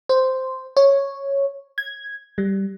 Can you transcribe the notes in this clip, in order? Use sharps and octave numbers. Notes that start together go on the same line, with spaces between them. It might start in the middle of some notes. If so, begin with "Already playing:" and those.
C5
C#5
G#6
G3